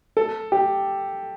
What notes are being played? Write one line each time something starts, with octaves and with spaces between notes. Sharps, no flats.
A4
G4